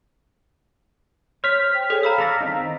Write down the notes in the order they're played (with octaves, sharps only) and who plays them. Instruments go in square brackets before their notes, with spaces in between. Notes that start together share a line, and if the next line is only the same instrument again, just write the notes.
[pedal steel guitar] C5 [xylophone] C#5 [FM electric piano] F6 B6
[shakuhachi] G5
[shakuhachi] G#4 [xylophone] A4 C#5
[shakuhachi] F5 [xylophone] A#5 B5 E6
[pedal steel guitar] A4 D5 A#5 [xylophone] A#6 F7
[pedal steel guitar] D#3 C4 D#4